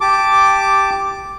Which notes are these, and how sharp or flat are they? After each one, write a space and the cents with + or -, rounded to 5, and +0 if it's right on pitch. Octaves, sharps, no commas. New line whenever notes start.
G4 +0 A5 +0 D6 +0